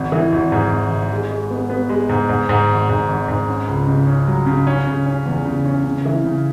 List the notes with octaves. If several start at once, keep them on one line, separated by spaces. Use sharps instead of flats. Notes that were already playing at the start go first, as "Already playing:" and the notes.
Already playing: G#1
E3
G#1
G#2
G#1
G#1
G#3
G#3
B3
B3
G#3
G#2
G#2
G#2
G#1
G#2
G#1
G#2
C#4
C#2
C#3
C#4
F#3
C#3
C#4
C#3
C#4
E2
C#3
C#4
C#3
E3
C#3